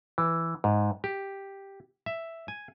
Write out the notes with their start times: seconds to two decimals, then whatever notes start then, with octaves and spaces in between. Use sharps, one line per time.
0.18 E3
0.64 G#2
1.04 G4
2.06 E5
2.48 G#5